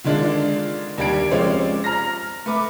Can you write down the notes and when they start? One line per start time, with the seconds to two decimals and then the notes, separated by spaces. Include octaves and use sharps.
0.04 D3 D#3 G#3 D4 F4
0.98 D#2 G3 D4 G4 G#6 D7
1.31 F3 G#3 C4 C#4 D5
1.84 A#5 F6 A#6
2.46 A3 B4 D6